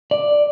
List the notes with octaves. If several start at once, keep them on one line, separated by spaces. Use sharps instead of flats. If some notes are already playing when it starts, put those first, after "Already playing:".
D5